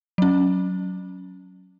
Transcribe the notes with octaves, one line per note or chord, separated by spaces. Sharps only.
F#3 C#4